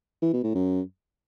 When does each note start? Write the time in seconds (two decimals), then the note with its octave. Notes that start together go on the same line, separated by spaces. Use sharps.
0.22 E3
0.33 B2
0.44 A2
0.55 F#2